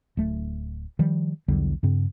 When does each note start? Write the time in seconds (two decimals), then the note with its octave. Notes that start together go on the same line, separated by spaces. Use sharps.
0.17 D1 A3
0.99 D#3 F3 G3
1.48 B1 E2 D3 G3
1.83 G2 C#3 C4